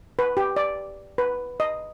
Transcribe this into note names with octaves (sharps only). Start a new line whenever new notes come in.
B4
G4
D5
B4
D#5